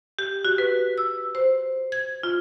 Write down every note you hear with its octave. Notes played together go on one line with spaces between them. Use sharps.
G4
F#4
B4
E6
C5
G#6
F4